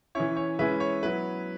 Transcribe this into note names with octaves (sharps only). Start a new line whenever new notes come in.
E3 C#4 E4 C#5
C#5
E3 G#3 C#4 E4 B4 E5
C#5
F#3 B3 E4 B4